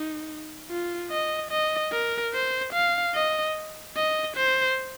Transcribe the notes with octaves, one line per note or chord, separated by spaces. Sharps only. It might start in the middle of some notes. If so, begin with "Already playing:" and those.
Already playing: D#4
F4
D#5
D#5
A#4
C5
F5
D#5
D#5
C5